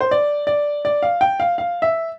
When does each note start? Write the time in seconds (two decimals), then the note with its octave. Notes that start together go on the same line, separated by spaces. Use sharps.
0.01 C5
0.11 D5
0.47 D5
0.85 D5
1.03 F5
1.21 G5
1.40 F5
1.58 F5
1.82 E5